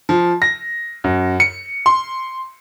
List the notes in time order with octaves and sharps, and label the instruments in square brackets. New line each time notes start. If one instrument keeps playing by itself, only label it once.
[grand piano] F3
A#6
F#2
C#7
C6